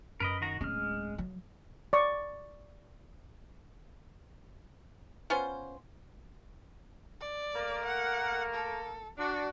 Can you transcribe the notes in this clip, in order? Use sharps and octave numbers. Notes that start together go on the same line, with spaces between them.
F#2 A#4 B4 D#5
D#3 F#4 A#5
D1 G#3 C#4 F6
F#3
D5 C#6
B3 C#4 F4 C5
D5
A3 A#3 A#4
F#5
A4
D4 F#4